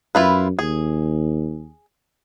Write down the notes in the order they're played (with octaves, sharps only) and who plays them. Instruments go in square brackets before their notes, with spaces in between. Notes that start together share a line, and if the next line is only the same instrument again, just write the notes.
[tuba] F#2 [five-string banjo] E4 F4 B4
[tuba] D#2 [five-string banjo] G#4